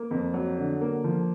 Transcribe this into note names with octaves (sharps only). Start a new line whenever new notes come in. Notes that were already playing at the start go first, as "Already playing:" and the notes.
Already playing: A#3
F2
F#3
D3
A#3
F3